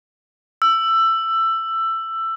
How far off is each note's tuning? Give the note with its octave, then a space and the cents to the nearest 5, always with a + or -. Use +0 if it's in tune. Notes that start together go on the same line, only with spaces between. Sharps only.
E6 +15